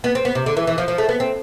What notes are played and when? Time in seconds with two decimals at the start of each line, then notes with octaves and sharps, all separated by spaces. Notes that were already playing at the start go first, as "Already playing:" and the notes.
0.04 B3
0.15 C4
0.25 B3
0.35 C3
0.46 D3
0.57 E3
0.67 E3
0.78 F3
0.88 F3
0.98 A3
1.09 B3
1.20 C4